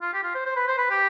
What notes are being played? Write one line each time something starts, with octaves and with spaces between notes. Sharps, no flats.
F4
G4
F4
C5
C5
B4
C5
B4
G4